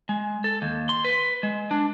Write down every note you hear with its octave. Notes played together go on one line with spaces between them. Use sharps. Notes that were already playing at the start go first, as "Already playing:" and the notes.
G#3
A4
D#2
C6
B4
G#3
D4